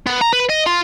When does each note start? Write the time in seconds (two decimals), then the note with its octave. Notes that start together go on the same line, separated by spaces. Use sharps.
0.06 B3
0.21 A#5
0.33 B4
0.50 D#5
0.66 F4